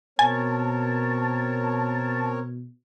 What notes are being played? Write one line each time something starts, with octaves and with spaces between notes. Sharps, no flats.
B2 C4 A#4 C#5 G#5 A5